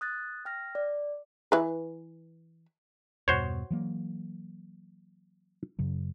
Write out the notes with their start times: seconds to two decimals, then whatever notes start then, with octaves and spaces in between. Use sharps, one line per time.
0.01 D#6 F#6 A6
0.45 G5 F6 A#6
0.75 D5
1.52 E3 B4
3.28 E2 G2 B2 F#4 C5 C#5
3.71 E3 F#3 A#3
5.79 F#2 C#3 F#3